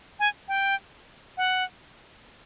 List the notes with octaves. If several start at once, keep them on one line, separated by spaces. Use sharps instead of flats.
G#5
G5
F#5